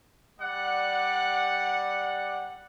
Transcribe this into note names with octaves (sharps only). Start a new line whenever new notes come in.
G3 D5 F#5